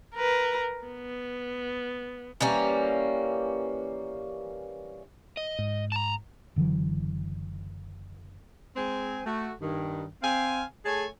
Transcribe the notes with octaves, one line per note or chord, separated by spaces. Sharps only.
A#4 B4
B3
E3 G3 A#3 C#4
D#5
G#2
A5 A#5
F#1 D3 E3 F#3
G#3 C4 G#5
A3 F#4
G2 D#3
C4 F5 G#5
A3 G#4 C#5 G#5 A5